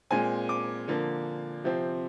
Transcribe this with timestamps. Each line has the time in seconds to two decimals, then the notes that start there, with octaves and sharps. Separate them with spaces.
0.10 A#2 G#3 C4 G#5
0.49 D6
0.88 D3 F3 A#3
1.64 C3 F3 C4